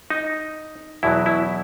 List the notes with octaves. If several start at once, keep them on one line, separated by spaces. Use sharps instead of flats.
D#4
E2 B2 F#3 E4
E4